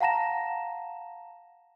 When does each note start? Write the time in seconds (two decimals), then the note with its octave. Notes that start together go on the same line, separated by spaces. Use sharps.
0.01 F5 F#5 A5 A#5 A#6 E7